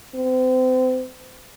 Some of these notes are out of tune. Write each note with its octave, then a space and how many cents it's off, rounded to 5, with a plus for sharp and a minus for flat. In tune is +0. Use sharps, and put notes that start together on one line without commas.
C4 -35